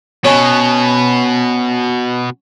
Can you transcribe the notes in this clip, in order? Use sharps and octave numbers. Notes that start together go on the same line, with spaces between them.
B2 C#4 C#5